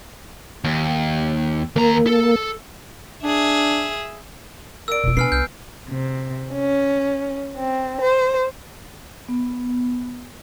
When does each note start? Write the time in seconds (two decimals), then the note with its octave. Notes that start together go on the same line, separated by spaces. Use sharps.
0.64 D#2
1.76 D#2 A#3 A#5
2.07 A4
3.24 D4 G#4 E5
4.88 A#4 D5 E6 D7
5.04 F1 B2 F4
5.17 B3 D4 G#5 F6 C7
5.32 C2 F6 G6
5.89 C3
6.52 C#4
7.56 C4
8.00 C5
9.28 B3